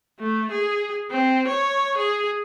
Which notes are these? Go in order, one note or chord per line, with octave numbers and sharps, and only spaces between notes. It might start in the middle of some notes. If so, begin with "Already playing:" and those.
A3
G#4
C4
C#5
G#4